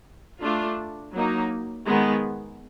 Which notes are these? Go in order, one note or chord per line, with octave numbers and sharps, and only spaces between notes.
A3 D4 F4
F#3 A#3 D#4
D#3 G#3 B3